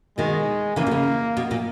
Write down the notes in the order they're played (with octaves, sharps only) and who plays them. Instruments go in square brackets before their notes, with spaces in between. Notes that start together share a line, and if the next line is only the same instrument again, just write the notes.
[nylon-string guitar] B2 D#3 [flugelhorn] G#3
[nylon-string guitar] C#3 E3 [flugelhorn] A#3
[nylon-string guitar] B2
C#3
B2
A#2